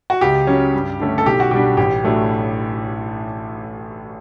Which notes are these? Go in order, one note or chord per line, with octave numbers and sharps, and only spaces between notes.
F#4
C#2 G4
C#3 F#3 C#4
G2
D3 A3 C#4
A4
B1 G4
F#4
B2 G3 D4 G4
A1 G4
A2 F#3 A3 D4